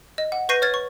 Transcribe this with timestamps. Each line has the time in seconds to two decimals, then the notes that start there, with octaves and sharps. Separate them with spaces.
0.18 D#5
0.32 F#5
0.49 B4 C#6 G6 A#6 C7 D#7
0.62 C#5 F6 G#6 A6
0.74 C#6